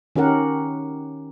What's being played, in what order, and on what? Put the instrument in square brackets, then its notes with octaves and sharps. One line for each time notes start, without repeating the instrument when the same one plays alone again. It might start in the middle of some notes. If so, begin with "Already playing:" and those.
[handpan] D#3 C#4 G4 A#4 F#5